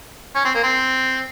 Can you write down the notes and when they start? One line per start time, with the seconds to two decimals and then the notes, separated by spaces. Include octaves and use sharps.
0.36 C#4
0.45 C4
0.55 A#3
0.63 C4